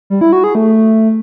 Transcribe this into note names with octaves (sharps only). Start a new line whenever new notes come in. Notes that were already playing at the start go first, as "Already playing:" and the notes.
G3
E4
F#4
G#4
A3